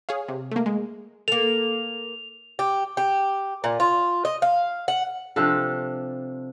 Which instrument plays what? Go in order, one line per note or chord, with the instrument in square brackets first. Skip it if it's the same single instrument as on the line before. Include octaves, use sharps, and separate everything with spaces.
[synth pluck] G#4 C#5 F5
C3
A3 A#3
G#3
[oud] A#3 A4 [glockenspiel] F7
[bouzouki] G4
G4
A#2
F4
D#5
F5
F#5
[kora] C3 F3 D4 A4